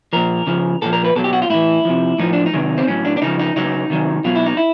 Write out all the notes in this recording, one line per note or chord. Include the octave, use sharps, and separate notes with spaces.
A#2 F3 A#4
C#3 F3
A#2 F3 A4
A#4
B4
B2 F#3 A4
G4
F#4
F4
A2 E3 E4
C3 F3
A2 F3 D#4
D4
D#4
C3 D#3 F#3
C4
A2 F#3 C#4
D4
D4
C#3 F3 D#4
D#4
C#3 F#3 D#4
C3 D#3 F#3
B2 F#3 F4
E4
D#4
E4